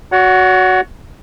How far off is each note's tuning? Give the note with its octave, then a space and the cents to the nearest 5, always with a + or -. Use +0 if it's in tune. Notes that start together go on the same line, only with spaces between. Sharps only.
F#4 +0 C#5 +40 F#5 +0